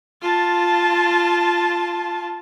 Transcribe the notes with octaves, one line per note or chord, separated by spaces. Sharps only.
F4 A5